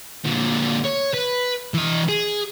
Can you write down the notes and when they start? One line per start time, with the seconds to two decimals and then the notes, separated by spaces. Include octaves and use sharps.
0.25 A#2 D3
0.85 C#5
1.14 B4
1.74 E3 D#5
2.09 G#4